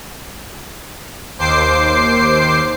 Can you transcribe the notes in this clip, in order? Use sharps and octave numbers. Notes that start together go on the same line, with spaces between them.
D#2 C5 D6 C7